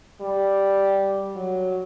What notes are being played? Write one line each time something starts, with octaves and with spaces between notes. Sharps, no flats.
G3
F#3